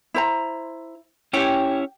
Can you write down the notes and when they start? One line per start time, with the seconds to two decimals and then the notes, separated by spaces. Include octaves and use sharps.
0.14 E4 C5 A#5
1.33 C#4 E4 G4 C#5 G5